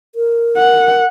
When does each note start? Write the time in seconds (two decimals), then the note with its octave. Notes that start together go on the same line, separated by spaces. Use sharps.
0.15 A#4
0.58 F#5